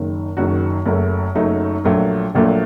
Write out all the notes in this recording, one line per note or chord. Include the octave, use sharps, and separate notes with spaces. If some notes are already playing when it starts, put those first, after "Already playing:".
Already playing: F#1 F#2 D#3
F#1 F#2 D#3 F#4
F#1 F#2 F#3 A3
F#1 F#2 F#3 A3 D#4
A#1 A#2 F#3 A3
A#1 A#2 F#3 A3